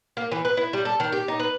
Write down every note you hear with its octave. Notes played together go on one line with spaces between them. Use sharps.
A#3
E3
B4
E4
G3
A4
D#3
G4
D#4
B4